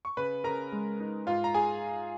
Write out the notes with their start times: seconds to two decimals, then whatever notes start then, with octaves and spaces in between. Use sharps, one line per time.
0.05 C#6
0.17 C#3 B4 B5
0.44 C#3 A#4 A#5
0.72 G#3
1.00 D#4
1.27 G#2 F4 F5
1.44 A#5
1.54 G#4 G#5